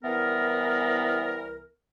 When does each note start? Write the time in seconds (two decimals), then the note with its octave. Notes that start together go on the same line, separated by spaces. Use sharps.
0.04 C2 E3 B3 A#4